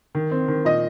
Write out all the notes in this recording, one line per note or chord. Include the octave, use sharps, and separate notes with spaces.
D#3
C4
D#3
A#2 D#5